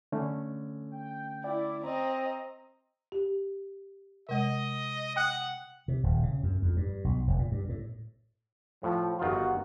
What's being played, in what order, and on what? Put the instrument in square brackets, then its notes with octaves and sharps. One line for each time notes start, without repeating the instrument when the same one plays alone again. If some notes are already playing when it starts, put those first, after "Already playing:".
[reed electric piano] D3 A3 C#4
[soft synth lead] G5
[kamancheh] E4 [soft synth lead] D5
[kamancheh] C4 D#5 [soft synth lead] A#5
[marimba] G4
[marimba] C3 G#3 [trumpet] D#5
[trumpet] F#5 [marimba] G5 D#6 F#6
[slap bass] C3
D#1
C#3
F#2
F2
G2
B1
F1
A#2
G2
A2
[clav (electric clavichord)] A2 [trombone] F3
[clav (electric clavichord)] G1 D#3 F4 [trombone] F#4